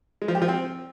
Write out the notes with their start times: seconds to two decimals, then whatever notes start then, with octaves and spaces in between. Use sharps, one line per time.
0.22 G#3
0.28 F3
0.35 G4
0.42 F3
0.48 C4